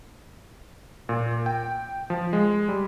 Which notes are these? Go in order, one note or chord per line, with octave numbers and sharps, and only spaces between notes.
A#2
G5
F3
G#3
G3